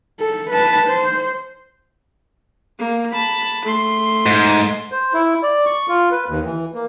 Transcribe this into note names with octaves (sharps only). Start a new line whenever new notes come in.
A4
B4 A5
C5
A#3
A5 B5
A3 C6
G#2
C5
E4
D5
C#6
F4
B4
D#2
E3
A#3